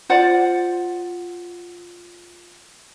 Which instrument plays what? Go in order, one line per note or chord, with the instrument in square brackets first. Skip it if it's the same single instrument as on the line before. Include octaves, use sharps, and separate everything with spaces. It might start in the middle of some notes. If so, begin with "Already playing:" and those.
[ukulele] F4 C5 D5 F#5